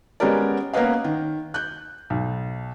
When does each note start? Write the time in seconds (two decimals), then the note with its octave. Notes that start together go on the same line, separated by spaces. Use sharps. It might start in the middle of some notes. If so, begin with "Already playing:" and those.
0.20 G#3 B3 C#4 G4 A#4 D5
0.73 A#3 B3 C#4 B4 D#5 F5
1.04 D#3
1.54 F#6 G6
2.10 B1